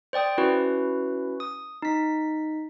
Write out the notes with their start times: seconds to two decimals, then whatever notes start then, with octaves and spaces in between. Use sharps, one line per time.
0.13 C5 D5 G5 D#6
0.38 C#4 E4 F#4 B4
1.40 D#6
1.82 D#4 B6